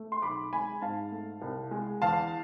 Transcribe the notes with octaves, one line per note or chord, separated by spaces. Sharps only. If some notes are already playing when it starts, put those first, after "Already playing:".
Already playing: A3
C6
B1 B5 D6
G#3 G#5 B5
G#2 F5 A5
A3
C2
G#3
E2 F5 A5